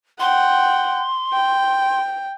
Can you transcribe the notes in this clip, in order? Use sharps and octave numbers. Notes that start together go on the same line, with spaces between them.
F#5 G5 C6
G5